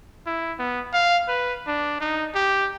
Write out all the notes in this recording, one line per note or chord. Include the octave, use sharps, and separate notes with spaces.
E4
B3
F5
B4
D4
D#4
G4